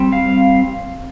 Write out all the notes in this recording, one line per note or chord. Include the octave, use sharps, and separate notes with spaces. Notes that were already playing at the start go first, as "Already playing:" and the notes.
Already playing: G3 C4
F5